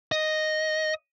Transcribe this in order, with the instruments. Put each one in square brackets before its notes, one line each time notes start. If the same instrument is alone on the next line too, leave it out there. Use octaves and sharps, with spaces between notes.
[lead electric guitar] D#5